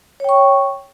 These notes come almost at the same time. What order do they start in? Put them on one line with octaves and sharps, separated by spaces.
C#5 G5 C#6